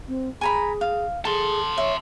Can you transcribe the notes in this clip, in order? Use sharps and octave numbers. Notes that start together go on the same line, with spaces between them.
C4
G#4 G#5 A#5 B5
F5
G#4 A4 A5 C6
C#5 E5